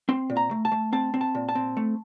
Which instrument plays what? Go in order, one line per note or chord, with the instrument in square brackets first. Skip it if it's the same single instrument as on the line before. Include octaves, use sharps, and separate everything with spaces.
[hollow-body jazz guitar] C4 C6
A#2
A#5
A3
A5
A3
C4 A5
C4
A5
A#2
A5
C4
A3